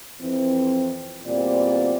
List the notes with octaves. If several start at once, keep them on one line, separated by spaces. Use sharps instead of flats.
F2 E3 C4
E2 A#2 G3 C4 D5